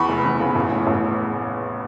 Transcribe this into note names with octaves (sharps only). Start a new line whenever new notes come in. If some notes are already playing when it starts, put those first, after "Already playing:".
Already playing: E2 B3 B5 C#6
F1
E2
C#3
A1
A2
A1